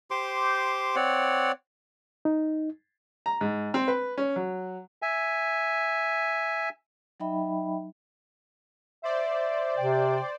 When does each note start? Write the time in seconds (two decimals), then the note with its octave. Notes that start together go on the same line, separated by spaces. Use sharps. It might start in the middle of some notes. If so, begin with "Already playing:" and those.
0.11 G4 C5 C6 D6
0.96 C4 C#5 D5 F#5
2.25 D#4
3.26 A#5
3.41 G#2
3.74 C4
3.88 B4
4.18 C#4
4.36 F#3
5.02 E5 G#5
7.20 F#3 D#4 D#5 E5 G5 B5
9.03 C5 D5 E5
9.77 C3 G5